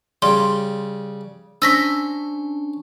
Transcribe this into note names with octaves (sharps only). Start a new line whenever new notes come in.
C#3 G3 C6
C#4 D4 C5 C#6 E6 A#6 B6